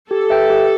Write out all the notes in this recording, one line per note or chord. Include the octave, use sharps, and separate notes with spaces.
G4 A4
B4 E5 G5
G4